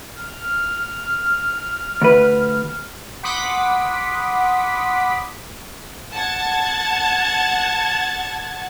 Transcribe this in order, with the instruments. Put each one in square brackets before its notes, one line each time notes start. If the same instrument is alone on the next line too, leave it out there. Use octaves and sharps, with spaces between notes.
[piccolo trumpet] F6
[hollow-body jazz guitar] D2 B4
[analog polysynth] F#5 B5 C6 D6 D#6 B6
[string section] F#5 A5 G#6 A6